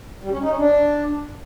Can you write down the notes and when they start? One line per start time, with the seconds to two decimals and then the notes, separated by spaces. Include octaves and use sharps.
0.22 G3
0.31 C#4
0.40 D#4
0.49 C#4
0.58 D4